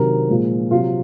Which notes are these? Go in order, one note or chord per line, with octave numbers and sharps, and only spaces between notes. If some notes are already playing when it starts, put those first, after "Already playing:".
Already playing: C3 D#3 F#3 A#4
A#2 F3 G#3
C3 F#3 F4